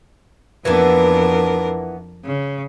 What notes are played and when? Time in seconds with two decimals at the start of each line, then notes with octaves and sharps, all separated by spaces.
0.65 F2 E3 A#3 B3 D4 A#4
2.23 C#3